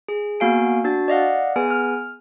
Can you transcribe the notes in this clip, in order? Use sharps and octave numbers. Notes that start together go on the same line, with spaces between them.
G#4
A#3 B3 F#4 F5 G#5 D7
D4 F#4 A6
D5 D#5 F5 F#5
B3 G#4 B4 G#5
F6